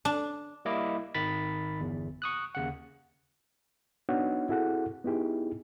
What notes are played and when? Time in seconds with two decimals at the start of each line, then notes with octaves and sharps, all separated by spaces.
0.05 D4
0.65 G3 A#3 E4 D#5 D6
1.14 G#1 D#3 B5 A6 B6
1.81 G1 E2
2.22 C#6 D#6 F#6
2.55 D#2 C#3 F#5
4.09 B3 D4 D#4 F#4 C#5 F#5
4.49 C4 E4 F#4 G#4 A4 F#5
5.04 B3 D#4 E4 G4 G#4